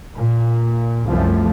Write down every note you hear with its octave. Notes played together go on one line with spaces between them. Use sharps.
A#2
C2 F#2 F3 A3